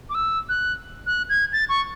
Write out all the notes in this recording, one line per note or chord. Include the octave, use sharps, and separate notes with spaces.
D6
E6
F#6
F#6
G#6
A6
C#6